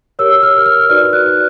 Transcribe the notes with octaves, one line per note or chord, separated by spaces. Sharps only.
G4 A#4 C#5 E6
F6
F6
D#4 F#4 B4 D5 F6
F#6